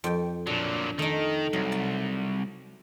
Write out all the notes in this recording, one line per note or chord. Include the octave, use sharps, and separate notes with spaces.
F2 G5
A#2 F#3 D4
D#3 A3 D#4
C2 F#3
A5